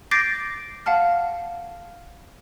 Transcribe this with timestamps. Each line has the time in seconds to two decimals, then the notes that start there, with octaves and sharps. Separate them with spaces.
0.11 D6 G6 A6 A#6 C7 D7
0.86 F5 F#5 A5 F6